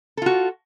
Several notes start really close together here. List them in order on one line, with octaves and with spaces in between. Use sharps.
A4 F4 F#4